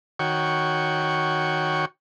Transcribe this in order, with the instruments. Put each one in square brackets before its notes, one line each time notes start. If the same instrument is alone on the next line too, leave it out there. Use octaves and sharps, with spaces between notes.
[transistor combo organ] D#3 F#4 C#5 G5 C#6